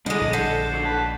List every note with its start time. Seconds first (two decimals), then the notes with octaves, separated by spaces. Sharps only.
0.06 D3 G3 G#3 D4 E4 D#5
0.21 A#1
0.33 D3 A4 C5
0.73 F#3 D#4
0.85 B1 B4 A5